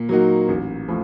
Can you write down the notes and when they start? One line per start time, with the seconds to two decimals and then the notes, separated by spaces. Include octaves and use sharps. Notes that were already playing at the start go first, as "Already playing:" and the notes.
Already playing: A#2
0.09 F#3 A#3 D#4 F#4
0.48 A1
0.88 A2 F3